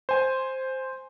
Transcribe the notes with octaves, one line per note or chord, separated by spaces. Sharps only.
C5 G#5